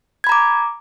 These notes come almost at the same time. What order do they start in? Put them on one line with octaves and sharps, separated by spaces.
G#6 B5 A#5 D6